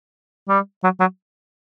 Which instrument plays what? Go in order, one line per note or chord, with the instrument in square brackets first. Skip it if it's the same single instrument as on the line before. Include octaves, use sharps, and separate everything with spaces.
[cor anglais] G3
F#3
F#3